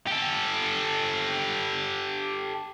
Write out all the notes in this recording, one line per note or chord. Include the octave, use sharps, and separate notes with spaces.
G4 A4